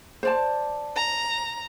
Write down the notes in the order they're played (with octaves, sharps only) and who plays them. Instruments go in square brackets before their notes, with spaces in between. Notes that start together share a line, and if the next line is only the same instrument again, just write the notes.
[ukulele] C5 D5 A5
[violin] A#5